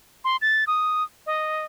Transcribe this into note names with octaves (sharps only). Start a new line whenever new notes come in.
C6
A6
D#6
D#5